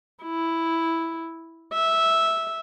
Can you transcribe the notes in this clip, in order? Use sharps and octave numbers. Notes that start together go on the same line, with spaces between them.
E4
E5